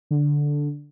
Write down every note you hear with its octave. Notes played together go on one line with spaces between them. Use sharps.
D3